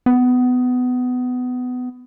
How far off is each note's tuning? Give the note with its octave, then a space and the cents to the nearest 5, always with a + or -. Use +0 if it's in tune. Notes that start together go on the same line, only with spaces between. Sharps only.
B3 +20